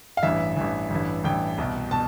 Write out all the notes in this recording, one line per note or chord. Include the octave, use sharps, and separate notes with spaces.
F5
A1 G2 E3 E5
A1 G2 E3
A1 G2 E3
A1 G2 E3 G5
C2 B2
B2 A5